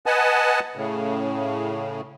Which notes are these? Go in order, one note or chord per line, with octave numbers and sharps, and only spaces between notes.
B4 D#5 F#5 G#5 A5
A2 C#3